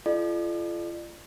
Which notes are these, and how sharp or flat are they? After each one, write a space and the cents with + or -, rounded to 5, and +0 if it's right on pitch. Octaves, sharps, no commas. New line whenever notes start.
F4 -35 A4 -35 D5 +40